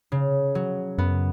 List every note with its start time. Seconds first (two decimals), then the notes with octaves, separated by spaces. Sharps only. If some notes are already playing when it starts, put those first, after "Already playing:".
0.12 C#3
0.55 F#3
0.98 F#2 B3